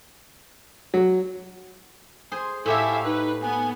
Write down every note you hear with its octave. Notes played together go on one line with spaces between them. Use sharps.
F#3
G#4 C5
A2 E4 G4 A4 E5 F5 G#5
D#4 B4
B3 G#5